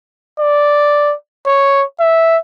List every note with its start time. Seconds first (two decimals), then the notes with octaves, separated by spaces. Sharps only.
0.39 D5
1.46 C#5
2.00 E5